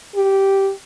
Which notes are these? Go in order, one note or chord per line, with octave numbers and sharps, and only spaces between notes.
G4